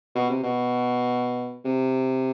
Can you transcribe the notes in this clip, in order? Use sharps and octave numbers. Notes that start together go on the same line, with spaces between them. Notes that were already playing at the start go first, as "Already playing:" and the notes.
B2
C3
B2
C3